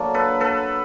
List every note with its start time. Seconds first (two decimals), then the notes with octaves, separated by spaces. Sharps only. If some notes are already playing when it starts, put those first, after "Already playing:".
Already playing: D3 F#3 A#3
0.14 A4 B4
0.41 A4 B4